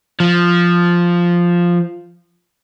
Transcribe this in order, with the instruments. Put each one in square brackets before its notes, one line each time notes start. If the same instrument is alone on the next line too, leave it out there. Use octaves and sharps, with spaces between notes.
[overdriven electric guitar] F3